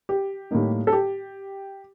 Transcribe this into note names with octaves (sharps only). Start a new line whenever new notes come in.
G4
A2 G3 A#3 D#4
A4
G4